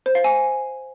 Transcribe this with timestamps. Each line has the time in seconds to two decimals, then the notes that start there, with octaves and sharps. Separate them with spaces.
0.06 C5
0.15 F5
0.24 G#5